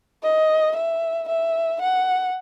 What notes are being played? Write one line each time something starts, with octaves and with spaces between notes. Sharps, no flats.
D#5
E5
E5
F#5